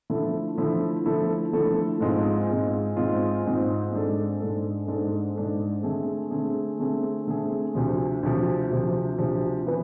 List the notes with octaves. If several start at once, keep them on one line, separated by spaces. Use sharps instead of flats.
D3 F3 A3 E4 A4
D3 F3 A3 E4 A4
D3 F3 A3 E4 A4
D3 F3 A3 E4 A4
G#2 G#3 C4 F4
G#2 G#3 C4 F4
G#2 G#3 C4 F4
G#2 G#3 C4 F4
G#2 G#3 D4 A4
G#2 G#3 D4 A4
G#2 G#3 D4 A4
G#2 G#3 D4 A4
D3 A3 C4 G#4
D3 A3 C4 G#4
D3 A3 C4 G#4
D3 A3 C4 G#4
D2 C3 F3
D2 C3 F3
D2 C3 F3
D2 C3 F3
E3 B3 E4 B4